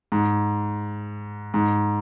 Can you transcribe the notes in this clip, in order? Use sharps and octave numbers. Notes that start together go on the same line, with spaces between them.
G#2
G#2